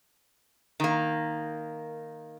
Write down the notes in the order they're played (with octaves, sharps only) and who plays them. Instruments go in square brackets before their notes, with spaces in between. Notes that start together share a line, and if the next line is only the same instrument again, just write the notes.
[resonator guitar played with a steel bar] D#3 A#3